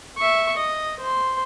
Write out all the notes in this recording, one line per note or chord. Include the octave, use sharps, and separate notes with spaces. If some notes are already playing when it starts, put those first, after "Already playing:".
E5 C#6
D#5
C5 C6